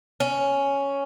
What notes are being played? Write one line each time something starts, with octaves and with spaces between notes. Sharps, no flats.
C#4